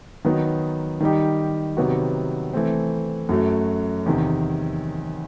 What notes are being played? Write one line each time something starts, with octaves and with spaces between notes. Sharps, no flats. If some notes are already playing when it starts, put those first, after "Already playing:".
D#3 F#3 B3 D#4
D#3 G3 D#4 G4
C3 D#3 F#3 B3 F#4
E3 A3 C4
F#2 F#3 A3
E2 C3 D#3